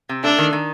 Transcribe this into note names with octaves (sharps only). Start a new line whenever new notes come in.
C3
A3 D4
D#3
D#3